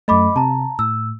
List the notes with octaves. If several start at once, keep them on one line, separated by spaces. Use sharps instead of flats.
F#2 A3 D#5 B5 D6
C3 A5 A#5
A2 E6